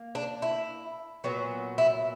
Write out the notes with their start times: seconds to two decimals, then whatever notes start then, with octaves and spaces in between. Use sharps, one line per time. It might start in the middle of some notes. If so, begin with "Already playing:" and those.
Already playing: A#3
0.15 D4
0.42 E4
1.24 A#2 F#3 B3
1.78 E4